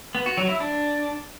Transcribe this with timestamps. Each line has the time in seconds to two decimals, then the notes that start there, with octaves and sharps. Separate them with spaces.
0.15 B3
0.26 F#4
0.37 F#3
0.49 E4
0.60 D4